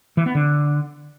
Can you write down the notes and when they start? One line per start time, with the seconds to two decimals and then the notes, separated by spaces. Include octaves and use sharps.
0.17 E3
0.26 B3
0.35 D3